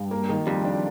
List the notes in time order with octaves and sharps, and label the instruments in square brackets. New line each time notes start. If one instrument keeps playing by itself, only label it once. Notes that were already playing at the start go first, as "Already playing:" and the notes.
Already playing: [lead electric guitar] G2
[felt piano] A#3
D#3
[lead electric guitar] F2 [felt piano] G3
[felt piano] D4